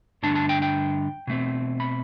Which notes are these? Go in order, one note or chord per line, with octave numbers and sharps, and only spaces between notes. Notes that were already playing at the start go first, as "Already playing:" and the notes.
G2 D3 A3 D4 A5
A5
G5
G5
B2 A3 C4
B5